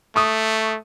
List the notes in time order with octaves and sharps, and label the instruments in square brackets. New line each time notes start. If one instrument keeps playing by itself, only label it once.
[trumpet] A3 [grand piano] C#6 D#6